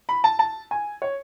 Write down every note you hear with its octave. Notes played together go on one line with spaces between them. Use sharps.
B5
A5
A5
G#5
C#5